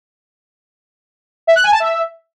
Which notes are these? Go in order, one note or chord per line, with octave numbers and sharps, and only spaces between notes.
E5
F#6
G#5
A5
E5